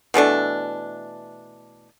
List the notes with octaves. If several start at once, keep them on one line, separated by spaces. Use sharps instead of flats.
B2 E3 A3 D4